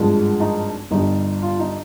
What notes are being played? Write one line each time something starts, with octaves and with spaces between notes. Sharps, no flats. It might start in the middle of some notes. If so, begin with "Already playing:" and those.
Already playing: G#1 G2 F3 G#3
D#4
G1 G2 G3 D#4
F4
D#4